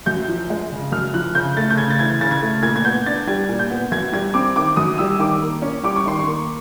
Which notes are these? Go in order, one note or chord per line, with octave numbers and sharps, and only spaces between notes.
F#2 G6
F3
G#3
C#3
F#2 F6
F3 F#6
C#3 G6
A3 A6
G6
C#3 G#6
A6
E3 G#6
C#3 A6
G#6
A3
A#2 G#6
G#6
B3 G6
D4 A6
G3 G#6
A#2
G6
B3
F#2 G#6
G3 G#6
C4 D6
D#3 D6
F#2 D#6
G3 E6
D#3 D6
A#3
C#4
G3 D6
C#6
D#3 C6
C#6
A#3